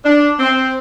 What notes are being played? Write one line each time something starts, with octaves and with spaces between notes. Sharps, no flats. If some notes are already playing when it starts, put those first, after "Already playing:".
D4
C4